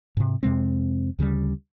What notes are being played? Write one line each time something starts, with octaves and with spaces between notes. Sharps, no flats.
G#2 C3
F2 C3 G#3 C4
D2 C#3 F3 G3